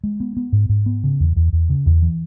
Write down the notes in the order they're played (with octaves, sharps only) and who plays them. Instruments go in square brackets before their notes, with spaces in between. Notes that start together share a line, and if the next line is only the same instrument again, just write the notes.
[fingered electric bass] G#3
B3
B3
G#2
G#2
B3
C#3
E2
E2
E2
C#3
E2
E3